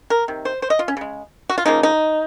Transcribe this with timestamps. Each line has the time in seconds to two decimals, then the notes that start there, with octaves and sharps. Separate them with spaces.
0.10 A#4
0.28 C3 D#3
0.45 C5
0.62 C5
0.70 D#5
0.79 F4
0.88 C#4
0.97 C#3 G#3
1.49 F#4
1.58 F4
1.66 C#3 F3 A#3 D#4
1.83 D#4